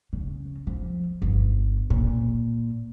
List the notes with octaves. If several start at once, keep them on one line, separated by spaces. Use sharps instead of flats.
C#3
F3
G1
A#2